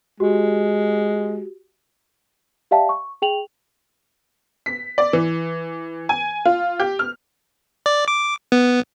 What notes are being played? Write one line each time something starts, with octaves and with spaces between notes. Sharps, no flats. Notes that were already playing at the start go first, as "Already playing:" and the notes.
G#3 F#4 G4
G4 D5 E5 F5 G5 A5
C#6
G#4 G5 F7 F#7
B6
D5
E3
G#5
F4
G4
F6
D5
D6
B3